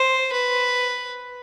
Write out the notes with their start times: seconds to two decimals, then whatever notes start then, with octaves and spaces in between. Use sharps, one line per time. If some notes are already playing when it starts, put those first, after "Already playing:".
Already playing: C5
0.32 B4